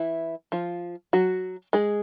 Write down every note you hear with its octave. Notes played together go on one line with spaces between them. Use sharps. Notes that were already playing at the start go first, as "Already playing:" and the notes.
Already playing: E3 E4
F3 F4
F#3 F#4
G#3 G#4